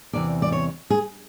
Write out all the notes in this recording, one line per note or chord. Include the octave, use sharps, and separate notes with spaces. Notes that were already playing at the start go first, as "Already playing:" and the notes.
E2 C3 E3 D5
D5
C#5
G#4